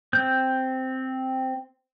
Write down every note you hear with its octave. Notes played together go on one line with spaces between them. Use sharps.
C4 G6